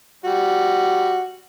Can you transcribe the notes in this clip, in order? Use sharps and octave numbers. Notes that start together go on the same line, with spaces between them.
G3 F#4